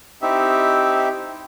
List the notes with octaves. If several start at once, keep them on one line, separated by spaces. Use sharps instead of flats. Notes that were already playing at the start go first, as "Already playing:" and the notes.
C4 D#4 E4 G4 E5